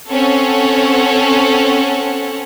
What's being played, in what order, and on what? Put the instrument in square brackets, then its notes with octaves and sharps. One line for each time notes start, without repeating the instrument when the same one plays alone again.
[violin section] C4 C#4 A4 C#5 F#5